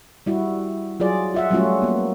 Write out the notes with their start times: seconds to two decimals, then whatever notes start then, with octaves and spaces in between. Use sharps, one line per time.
0.26 G3 E4 F#4
1.00 F#3 F4 G#4 D5
1.34 F4 E5 F#5
1.51 F#3 G3 A3 C#4 F4 F#4
1.82 A#3 B3